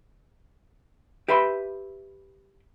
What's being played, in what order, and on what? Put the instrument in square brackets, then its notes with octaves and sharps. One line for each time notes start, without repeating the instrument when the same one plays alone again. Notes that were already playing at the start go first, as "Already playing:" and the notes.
[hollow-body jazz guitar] G4 B4 E5 B5 C6